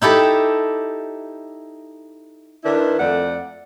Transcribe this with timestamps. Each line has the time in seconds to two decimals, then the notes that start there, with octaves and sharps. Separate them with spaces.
0.02 D#4 E4 G4 A4
2.64 D#3 D4 E4 B4
3.00 F2 A3 D5 F#5